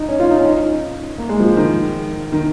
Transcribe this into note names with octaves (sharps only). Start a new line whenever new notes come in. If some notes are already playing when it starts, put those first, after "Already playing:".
Already playing: D#4
C#4
F4
D#4
C#4
D#4
A#3
G#3
F3
D#3
D#3